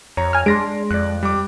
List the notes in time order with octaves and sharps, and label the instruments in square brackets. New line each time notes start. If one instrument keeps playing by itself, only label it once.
[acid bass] F2 [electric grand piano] C#5 A#5
[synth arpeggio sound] G#5 F6
[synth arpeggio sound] G#3 [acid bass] D4 [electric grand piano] C6 A#6 D7
[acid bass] F2 [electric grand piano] D5 F#6
[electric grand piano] G3 D6